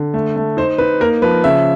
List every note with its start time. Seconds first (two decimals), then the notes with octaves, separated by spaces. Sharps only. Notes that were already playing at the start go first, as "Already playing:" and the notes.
Already playing: D3
0.14 A3
0.36 A3
0.57 D#4 C5
0.78 D#4 B4
1.00 A#3 A#4
1.22 F3 B4
1.44 C#3 E5